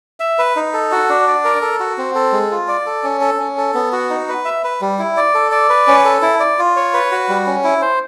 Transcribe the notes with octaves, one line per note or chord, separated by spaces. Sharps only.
E5
B4
D#4
A4
F#4
D4
D5
A#4
A4
F#4
C4
A4
G#3
F4
D5
A4
C#4
A4
C#4
A4
B3
F#4
D#4
B4
E5
B4
G3
E4
D5
A4
D5
B4
C#4
A4
E4
D5
F4
C#5
B4
F#4
G3
C#4
E4
C5